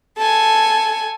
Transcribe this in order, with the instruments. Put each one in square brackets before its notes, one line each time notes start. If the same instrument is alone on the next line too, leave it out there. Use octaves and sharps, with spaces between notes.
[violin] A4 G#5